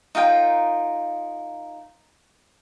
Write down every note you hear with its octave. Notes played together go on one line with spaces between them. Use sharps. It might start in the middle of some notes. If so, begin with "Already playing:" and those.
D#4 F4 A#4 G5